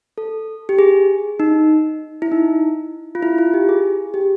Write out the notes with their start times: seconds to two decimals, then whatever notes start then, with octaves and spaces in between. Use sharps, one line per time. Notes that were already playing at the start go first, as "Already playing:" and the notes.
0.18 A4
0.69 G4
0.79 G#4
1.40 D#4
2.22 E4
2.32 D#4
3.15 F4
3.23 E4
3.38 F4
3.54 G4
3.69 G#4
4.14 G4